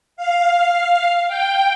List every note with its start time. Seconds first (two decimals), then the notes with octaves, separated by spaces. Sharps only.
0.17 F5
1.28 G5